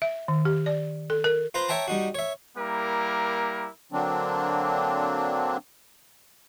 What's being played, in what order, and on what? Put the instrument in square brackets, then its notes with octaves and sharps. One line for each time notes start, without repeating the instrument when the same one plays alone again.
[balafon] E5
D#3
G4
D5
A4
A#4
[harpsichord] F4 B4 C5 A#5
C#5 E5 G5 A5 A#5
G3 D#4 F#4
C#5 E5
[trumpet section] G3 A#3 E4 A#4
[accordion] D3 F#3 A#3 C4 D4